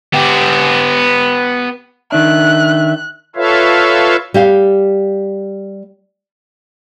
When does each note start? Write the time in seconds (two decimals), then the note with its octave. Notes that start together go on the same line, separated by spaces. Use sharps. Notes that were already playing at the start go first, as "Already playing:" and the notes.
0.14 B3 G4
2.12 D#3 D4 E5 F#6
3.36 F4 A4 B4 C#5 E5 F5
4.34 G3 G4 F5